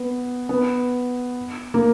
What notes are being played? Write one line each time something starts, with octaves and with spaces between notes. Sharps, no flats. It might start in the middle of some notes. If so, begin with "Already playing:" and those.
Already playing: B3
B3
A#3